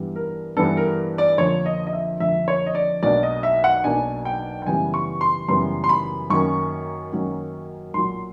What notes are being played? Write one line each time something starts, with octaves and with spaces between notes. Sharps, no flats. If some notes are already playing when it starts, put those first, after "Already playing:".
Already playing: G2 E3 G3 B3 D4
A#4
G2 E3 G3 B3 D4 A4
A#4
D5
F2 D3 F3 A#3 C#5
D#5
D#5
E5
F2 D3 F3 A#3 E5
C#5
D#5
D5
B1 B2 F#3 A#3 D4 D5
D#5
E5
F#5
B1 B2 F#3 A#3 D4 G#5
G5
G5
F#2 C#3 E3 G3 B3 G#5
C#6
C6
F#2 C#3 E3 G3 B3 C6
C6
B5
F#2 D#3 F#3 A#3 C#4 C#6
F#2 D#3 F#3 A#3 C#4
B1 A#2 F#3 C6